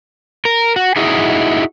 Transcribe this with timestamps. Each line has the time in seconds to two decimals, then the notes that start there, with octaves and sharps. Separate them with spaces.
0.45 A#4
0.76 F#4
0.96 D#4 E4 F#4 G#4